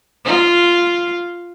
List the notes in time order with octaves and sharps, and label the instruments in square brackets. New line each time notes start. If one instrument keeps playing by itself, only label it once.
[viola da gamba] F4